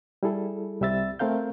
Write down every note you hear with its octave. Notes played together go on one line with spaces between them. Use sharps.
G3 E4 G#4 A4
C2 G3 C4 E5 E6 A6
A3 C4 A#4 F5 G6